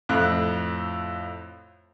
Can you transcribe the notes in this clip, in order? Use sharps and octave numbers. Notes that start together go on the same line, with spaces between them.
F2 A2 F#6